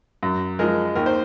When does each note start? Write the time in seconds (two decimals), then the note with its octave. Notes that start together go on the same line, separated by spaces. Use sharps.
0.23 F#2
0.59 F3 G#3 A#4
0.95 D#2 A#4
1.06 C5